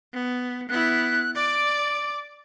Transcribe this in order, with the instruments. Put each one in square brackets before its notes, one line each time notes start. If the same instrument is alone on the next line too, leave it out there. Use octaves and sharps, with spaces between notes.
[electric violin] B3
[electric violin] B3 E4 [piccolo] F#6
[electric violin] D5 [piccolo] D6